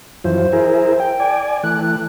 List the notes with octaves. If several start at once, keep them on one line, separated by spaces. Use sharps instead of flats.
F#2 E3 F3 C5
E4 G#4 A#4
G5
D5 G#5
E3 A3 F#6